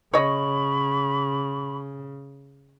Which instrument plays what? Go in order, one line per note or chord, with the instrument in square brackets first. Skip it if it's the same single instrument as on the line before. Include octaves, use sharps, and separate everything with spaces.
[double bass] C#3 [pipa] C#5 D#5 [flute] B5 [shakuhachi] C#6